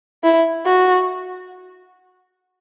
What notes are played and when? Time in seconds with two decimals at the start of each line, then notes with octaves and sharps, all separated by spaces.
0.23 E4
0.66 F#4